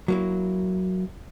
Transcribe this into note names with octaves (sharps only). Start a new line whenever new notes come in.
F#3 A#3 E4